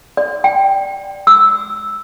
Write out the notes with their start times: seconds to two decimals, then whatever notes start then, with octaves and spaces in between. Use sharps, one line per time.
0.17 D5
0.44 G5
1.27 E6